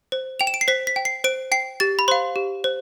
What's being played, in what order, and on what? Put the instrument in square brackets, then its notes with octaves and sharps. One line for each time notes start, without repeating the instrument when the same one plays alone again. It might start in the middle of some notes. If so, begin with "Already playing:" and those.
[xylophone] C5
G5 F7
E7
D7
C7
C5 B6
B6
G5
C7
C5 D7
G5 C7
G4 A6
B5
C5 F5 C6
G4
C5